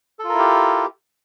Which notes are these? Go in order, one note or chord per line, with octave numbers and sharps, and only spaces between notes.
E4 F4 G4 A4 A#4